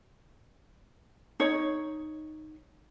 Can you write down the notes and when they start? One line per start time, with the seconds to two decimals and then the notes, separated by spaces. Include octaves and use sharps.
1.40 D#4 C#5